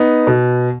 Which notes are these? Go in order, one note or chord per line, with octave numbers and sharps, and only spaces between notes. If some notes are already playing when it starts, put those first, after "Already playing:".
Already playing: B3 D#4
B2